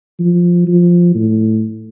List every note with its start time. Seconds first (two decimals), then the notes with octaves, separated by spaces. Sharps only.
0.20 F3
0.67 F3
1.15 A2